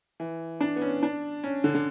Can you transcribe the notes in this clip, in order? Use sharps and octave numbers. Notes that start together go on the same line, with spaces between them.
E3
D4
B3
C#4
D4
C#4
D3
D3